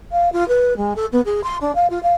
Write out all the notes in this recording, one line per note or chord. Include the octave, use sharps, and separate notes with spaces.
F5
F4
B4
G#3
A4
B3
G#4
C6
D4
F5
F4
F5